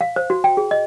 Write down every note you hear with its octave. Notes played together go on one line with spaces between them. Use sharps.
F5
C5
F#4
G5
G#4
D#5